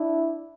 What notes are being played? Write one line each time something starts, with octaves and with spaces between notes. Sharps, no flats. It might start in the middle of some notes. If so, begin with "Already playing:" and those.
Already playing: D4 E4